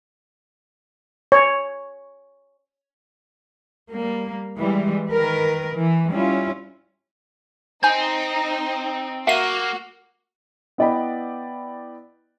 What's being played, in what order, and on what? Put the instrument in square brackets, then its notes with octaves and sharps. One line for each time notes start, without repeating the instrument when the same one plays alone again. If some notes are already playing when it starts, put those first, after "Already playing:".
[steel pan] C#5
[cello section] G3 A#3
E3 G3 G#3
D#3 A#4 B4
E3
G3 C#4 E4 F4
[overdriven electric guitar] C4 [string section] D#4 [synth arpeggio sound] G#5 G6
[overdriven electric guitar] A#3 [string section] F#4 [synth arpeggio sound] E5 F5 D#7
[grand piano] B3 E4 D5 D#5 G5 B5